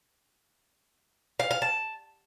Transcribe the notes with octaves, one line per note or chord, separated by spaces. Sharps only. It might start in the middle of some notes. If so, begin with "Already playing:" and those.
F5
F5
A5